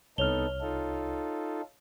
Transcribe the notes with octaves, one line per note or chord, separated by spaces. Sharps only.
C2 B3 D#4 A4 C#5 F6 F7 G7
D#4 F4 A4